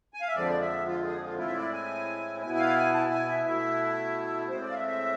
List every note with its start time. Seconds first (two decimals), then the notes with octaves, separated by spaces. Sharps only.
0.14 G#5
0.21 F5
0.28 E5
0.35 F2 D3 F3 G#3 D5
0.61 E5
0.87 F4
1.04 G#4
1.22 F4
1.38 A2 G#3 C4 E4 F4
1.47 E5
1.56 D5
1.73 G#5
2.42 B2 B3 E4 G#5
2.55 G#5
2.59 F5
2.76 G#5
2.93 A5
3.11 G#5
3.28 E5
3.45 B2 A3 E4 E5
4.49 A2 G#3 C4 C5
4.62 D5
4.70 F5
4.75 E5
4.88 E5